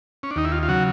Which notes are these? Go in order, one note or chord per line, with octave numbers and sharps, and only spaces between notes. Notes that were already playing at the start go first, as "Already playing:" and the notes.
C#4
D4
D#2 D#4
E4
F4
F4
C#3 F#3 F#4